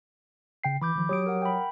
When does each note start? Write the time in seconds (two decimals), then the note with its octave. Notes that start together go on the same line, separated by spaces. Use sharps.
0.64 C#3 G5 C7
0.82 E3 B5 D6 G6
0.96 D#3 F3
1.09 F#3 G4 C#5 D#6 D7
1.26 A#4 F#5
1.42 G5 B5